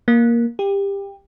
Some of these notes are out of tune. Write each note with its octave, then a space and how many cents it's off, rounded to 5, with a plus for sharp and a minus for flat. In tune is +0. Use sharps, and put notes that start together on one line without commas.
A#3 +10
G4 +20